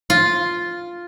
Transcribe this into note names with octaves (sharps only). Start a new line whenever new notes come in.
F4